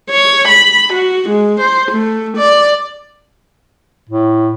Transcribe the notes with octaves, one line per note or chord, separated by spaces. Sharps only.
C#5
B5
F#4
G#3
C5
A3
D5
A2